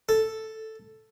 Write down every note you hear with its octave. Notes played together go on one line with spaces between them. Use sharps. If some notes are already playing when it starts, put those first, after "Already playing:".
A4